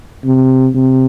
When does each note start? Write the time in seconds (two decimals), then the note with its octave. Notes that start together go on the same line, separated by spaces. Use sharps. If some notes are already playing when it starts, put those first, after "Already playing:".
0.25 C3
0.74 C3